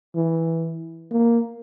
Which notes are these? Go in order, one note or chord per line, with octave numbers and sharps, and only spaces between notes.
E3
A#3